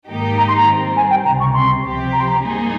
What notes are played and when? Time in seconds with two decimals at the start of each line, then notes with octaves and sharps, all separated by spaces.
0.08 G#2 D#3 A#3 D#4 G4
0.38 A#5
0.48 C6
0.58 A#5
0.66 D#3 G3 C4
0.97 G#5
1.10 G5
1.25 C#2 C3 G3 A#5
1.40 C#6
1.54 C6
1.83 C3 F3 C4 G4
2.13 A#5
2.20 C6
2.28 A#5
2.42 G#2 G3 A#3 D#4 G#4